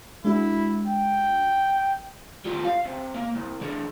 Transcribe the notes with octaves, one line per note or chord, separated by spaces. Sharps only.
G#3 D4 E4 F#4
G5
G3 F4
F5
C3
A#3
C2
E3 D4